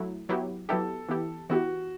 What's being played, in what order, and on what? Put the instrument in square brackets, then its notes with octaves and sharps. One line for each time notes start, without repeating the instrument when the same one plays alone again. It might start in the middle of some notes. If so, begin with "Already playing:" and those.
Already playing: [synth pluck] F#3 A3 E4
F#3 B3 E4 G4
[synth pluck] F#3 B3 E4 G4 [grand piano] A4
[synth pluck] E3 B3 E4 G4
[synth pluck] E3 B3 E4 G4 [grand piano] F#4